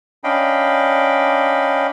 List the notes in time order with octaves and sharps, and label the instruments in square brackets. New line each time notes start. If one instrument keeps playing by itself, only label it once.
[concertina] C#4 D4 D#5 F5 G5 B5